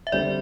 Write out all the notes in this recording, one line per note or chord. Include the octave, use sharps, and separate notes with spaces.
E5
D3 G3 C4 D5